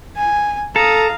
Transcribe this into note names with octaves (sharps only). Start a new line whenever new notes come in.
G#5
A4 F5 A#5 D#6